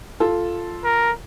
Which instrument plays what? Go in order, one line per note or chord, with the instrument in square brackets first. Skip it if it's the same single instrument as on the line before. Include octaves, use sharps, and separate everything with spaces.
[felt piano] F4 A4
[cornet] A#4